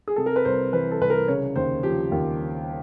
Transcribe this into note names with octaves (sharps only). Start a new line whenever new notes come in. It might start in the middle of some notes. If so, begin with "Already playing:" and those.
G#4
C3 A4
A#4
B4
C2 C5
E3 B4
A4
C2 B4
A#4
C#3 C#5
D#2 C5
F3 G4
D#2